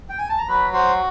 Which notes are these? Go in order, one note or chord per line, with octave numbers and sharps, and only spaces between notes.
G5
G#5
A5
A#5
F#3 B4 B5
F#4 C5 C6